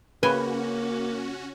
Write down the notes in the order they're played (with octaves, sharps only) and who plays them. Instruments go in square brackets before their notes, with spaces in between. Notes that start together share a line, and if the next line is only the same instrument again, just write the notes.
[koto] C#3 G5 G#5 [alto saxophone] A#3 [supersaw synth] C#4 F#4 [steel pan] B4